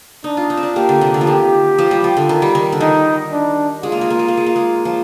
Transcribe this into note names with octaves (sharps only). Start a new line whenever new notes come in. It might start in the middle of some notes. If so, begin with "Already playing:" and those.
D4 D#4
F4
D#4
C4
D4
A#3 G4
D3
C3
D3
F3
D#3 G4
F3
G3
F3
D3
D#3
G3
D#3
D3
D#3 D#4
D4
G#3 F4
A#3
G#3
A#3
G#3
A#3
G#3
A#3
G#3
F3